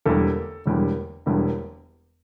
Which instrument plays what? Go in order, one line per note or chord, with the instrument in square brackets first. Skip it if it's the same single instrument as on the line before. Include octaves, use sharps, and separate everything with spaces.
[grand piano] E1 E2 D3 G3 A#3 A4
E1 E2 D3 G3 A#3
E1 E2 D3 G3 A#3